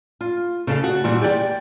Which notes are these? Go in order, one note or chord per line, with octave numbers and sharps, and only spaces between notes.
F4
C#3 A4 E5 F5
F#4
A#2 E3 G3 F#4
G4 D5 F#5 G5